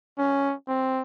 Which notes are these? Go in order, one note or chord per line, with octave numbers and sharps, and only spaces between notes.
C#4
C4